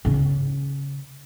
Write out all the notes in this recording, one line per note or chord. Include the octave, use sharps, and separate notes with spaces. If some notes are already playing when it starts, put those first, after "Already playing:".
C#3 C#4